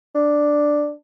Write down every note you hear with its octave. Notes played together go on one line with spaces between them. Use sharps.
D4